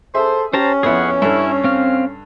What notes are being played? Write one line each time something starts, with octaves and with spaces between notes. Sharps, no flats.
G#4 A4 C5 E5
C#4 G4 C5 A5 A#5
F2 B3 E4 G#4 F#5
G2 E4 A4
C4 F5